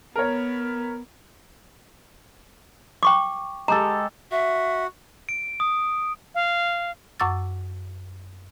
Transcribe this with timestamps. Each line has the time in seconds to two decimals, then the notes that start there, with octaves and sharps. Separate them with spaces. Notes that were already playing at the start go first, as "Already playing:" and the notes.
0.16 B3 A#4 C#5
3.03 G5 C#6 D6
3.68 G#3 G4 A4 A#5
4.31 F#4 E5
5.29 D7
5.60 D#6
6.35 F5
7.20 F#2 F#5 C#6 D6 E6 A6